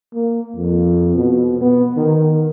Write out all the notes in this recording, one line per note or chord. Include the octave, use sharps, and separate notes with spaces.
A#3
F2
B2
B3
D#3